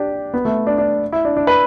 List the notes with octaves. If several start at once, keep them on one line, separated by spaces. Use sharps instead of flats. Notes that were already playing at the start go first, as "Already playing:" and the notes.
Already playing: D4 G4
B3
A3
D4
D4
E4
D4
D4
B4